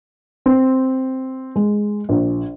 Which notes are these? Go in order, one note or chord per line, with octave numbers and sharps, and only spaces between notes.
C4
G#3
A#1